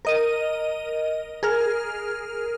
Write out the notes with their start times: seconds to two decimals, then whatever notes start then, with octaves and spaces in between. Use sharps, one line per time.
0.05 A#4 D#5 D#7
1.43 G#4 A#4 F6